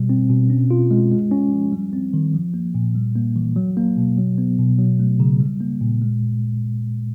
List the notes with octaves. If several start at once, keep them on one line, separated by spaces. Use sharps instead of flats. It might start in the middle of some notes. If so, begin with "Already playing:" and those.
Already playing: B2 G3
C4
B2
C#4
F4
G#3
G#3
C#4
F3
G3
C4
D#3
F3
A#3
A#2
G3
A#3
E3
F#3
A#3
B2
F#3
B3
B2
F#3
A3
C#3
G3
A#3
A#2
G#3